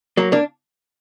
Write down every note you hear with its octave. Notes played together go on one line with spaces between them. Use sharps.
F#3 A#3
A#3 D4